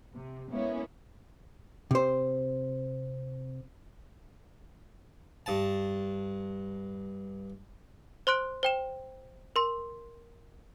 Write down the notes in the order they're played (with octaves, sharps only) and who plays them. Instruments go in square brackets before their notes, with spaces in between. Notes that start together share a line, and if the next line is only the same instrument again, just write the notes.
[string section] C3
G#3 A#3 B3 C#4 E4
[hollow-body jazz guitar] C3 C5
[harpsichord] G2 A5
[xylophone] C5 C6 F#6 D7
C5 G5 E7
A#4 C6